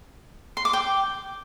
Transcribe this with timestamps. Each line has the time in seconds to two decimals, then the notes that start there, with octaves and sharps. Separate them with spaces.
0.57 C6
0.65 D6
0.73 G5